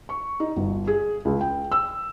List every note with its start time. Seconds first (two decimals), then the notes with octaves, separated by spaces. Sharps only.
0.09 C#6
0.40 D#4
0.57 G1
0.87 G#4
1.25 C#2
1.41 G5
1.72 E6